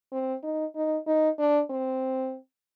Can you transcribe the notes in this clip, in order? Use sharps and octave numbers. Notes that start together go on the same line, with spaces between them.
C4
D#4
D#4
D#4
D4
C4